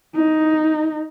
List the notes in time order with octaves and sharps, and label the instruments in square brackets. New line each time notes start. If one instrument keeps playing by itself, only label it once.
[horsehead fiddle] D#4